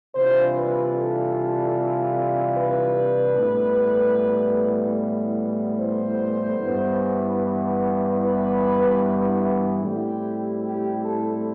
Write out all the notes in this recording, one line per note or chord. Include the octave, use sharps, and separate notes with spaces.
C3 E3 G3 D4 F4 C5
B4
A4
B4
A2 E3 G3 B3
C5
G2 E3 B3
B4
A2 G3 C4 E4 G4
G4
A4